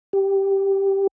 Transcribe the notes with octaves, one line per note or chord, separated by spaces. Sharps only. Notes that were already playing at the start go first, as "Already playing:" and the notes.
G4